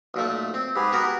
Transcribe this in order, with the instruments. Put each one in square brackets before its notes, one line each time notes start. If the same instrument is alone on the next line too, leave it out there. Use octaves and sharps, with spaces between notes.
[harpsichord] B1 A#2 A3
C4
[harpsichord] G#2 [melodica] G4 G#4 B4
[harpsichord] B3 F#4 A#4